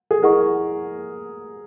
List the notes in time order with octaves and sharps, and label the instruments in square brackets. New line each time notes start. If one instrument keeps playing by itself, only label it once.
[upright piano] G#4
[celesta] E4 G#4 D#5 F#5 C#6 [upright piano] A#4